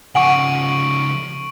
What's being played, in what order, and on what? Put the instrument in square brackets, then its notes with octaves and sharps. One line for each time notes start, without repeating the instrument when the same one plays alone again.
[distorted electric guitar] C#3 F3 [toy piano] F#5 G#5 D6 [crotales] C#6 D7 F#7